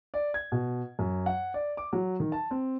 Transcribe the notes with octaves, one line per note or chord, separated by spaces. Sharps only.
D5
G#6
B2
F#2
F#5
D5
D6
F#3
D#3
A5
C4